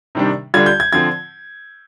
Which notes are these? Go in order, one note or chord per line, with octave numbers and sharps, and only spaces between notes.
C3 D#3 G3 D4
D3 G3 D4 F4 G#6
G6
G#6
D3 F3 C4 F4 G#6